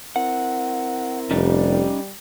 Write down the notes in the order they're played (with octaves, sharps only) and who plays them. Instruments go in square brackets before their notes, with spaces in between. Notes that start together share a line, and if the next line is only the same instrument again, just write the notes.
[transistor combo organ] C4 E4 A#4 [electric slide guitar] F#5
[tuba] F1 [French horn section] G3 [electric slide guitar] C#4 D#4 D5